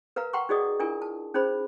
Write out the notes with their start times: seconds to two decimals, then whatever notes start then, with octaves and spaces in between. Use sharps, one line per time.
0.16 A#4 B4 F5 A#5
0.33 F#5 G5 A#5 C6 C#6
0.49 D#4 F#4 G#4 D5 D#5 D#6
0.79 D4 E4 F4 A#4 G#5
1.02 A5
1.34 C#4 D#4 G#4 C5 B5